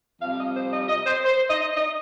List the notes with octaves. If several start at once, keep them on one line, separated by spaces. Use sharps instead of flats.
F2 C3 G3 F5
D#5
C5
D#5
D#5
C5
C5
D#5
D#5